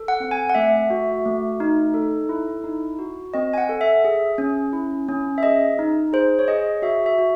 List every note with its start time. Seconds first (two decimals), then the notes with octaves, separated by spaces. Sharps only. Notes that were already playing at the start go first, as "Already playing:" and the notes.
Already playing: A4
0.08 F#5
0.20 C4
0.31 G#5
0.49 F#5
0.55 A3 E5
0.90 F#4
1.26 A3
1.60 D#4
1.94 A4
2.29 E4
2.64 D#4
2.99 F#4
3.34 C4 D#5
3.53 G#5
3.58 F#5
3.69 A4
3.81 E5
4.04 G#4
4.38 C#4
4.73 E4
5.09 C#4
5.38 E5
5.43 G#4 D#5
5.79 D#4
6.13 G#4 C5
6.39 C#5
6.48 G#4 D#5
6.82 F#4 E5
7.06 E5
7.18 F#4